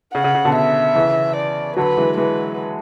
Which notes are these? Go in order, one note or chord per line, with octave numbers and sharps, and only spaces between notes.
C#3 F#5
C#3
C#3
B2 D3
E5
C#3 E3
D5
D3 F#3 B4
E3 G#3
E3 G#3 B4